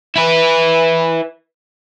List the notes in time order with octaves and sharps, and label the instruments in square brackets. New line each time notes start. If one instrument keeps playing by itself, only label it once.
[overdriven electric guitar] E4 B4